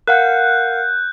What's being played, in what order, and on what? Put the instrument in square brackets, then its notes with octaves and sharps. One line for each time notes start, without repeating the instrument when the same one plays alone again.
[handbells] A#4 F5 F#5 [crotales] F#6 G6